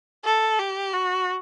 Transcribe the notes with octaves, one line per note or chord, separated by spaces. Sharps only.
A4
G4
F#4